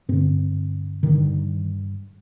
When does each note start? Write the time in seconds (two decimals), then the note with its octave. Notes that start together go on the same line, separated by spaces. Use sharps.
0.09 G2 D3 C4
1.03 G2 D3 D#3